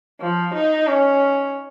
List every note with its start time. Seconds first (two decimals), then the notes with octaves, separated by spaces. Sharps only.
0.20 F3
0.54 D#4
0.88 C#4